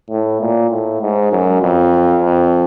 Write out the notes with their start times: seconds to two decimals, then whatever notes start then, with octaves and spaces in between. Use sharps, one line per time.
0.10 A2
0.41 A#2
0.71 A2
1.01 G#2
1.31 F#2
1.62 F2
2.22 F2